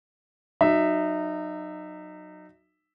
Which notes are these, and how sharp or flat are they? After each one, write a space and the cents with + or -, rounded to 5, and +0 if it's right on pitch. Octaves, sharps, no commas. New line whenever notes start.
F#3 +0 D#4 -25 E5 +0